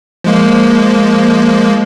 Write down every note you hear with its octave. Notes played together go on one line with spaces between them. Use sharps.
F3 G#3 A#3